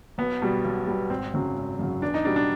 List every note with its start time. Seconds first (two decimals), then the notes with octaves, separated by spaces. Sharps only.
0.18 B1 B3
0.42 B2 G3
0.64 B1
0.87 B2 G3
1.10 G#1 C4
1.34 F#2 C#3 F#3
1.57 G#1
1.79 F#2 C#3 F#3
2.02 E2 D4
2.14 D#4
2.25 B2 G3 D4
2.36 D4